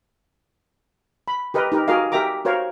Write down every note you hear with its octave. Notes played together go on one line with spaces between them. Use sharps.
B5
G4 A#4 B4 D#5
D#4 G4 A#4
F#4 G#4 A#4 D#5 F5
G4 A#4 E5 G5 A#5 D6
F#4 A#4 C5 C#5 F5